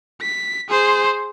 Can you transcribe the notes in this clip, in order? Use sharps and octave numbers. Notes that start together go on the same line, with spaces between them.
B6
G#4 C5